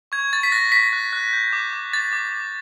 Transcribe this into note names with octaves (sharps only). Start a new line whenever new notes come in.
C#6 G#6
C#6 A6
B6
F#6 A#6
C#6 B6
F#6
F#6
G6
D6
D6
D6 A6
D6
D6